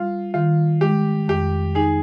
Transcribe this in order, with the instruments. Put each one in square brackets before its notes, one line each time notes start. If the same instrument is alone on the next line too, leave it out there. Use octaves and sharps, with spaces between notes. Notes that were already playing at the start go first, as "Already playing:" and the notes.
Already playing: [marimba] G3 [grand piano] F4
[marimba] D#3 [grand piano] F4
[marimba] G#3 [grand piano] G4
[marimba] F2 [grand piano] G4
[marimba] D#4 [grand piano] G#4